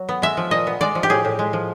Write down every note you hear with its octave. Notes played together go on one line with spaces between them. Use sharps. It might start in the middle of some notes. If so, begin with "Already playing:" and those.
Already playing: F#3
B3
G#3 E5
F3
A#2 D#5
B3
G#3 D5
F3
G4
A2 G#4
A2
G#3
F3